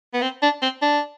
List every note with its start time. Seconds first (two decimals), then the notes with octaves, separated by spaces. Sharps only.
0.14 B3
0.22 C4
0.43 D4
0.62 C4
0.82 D4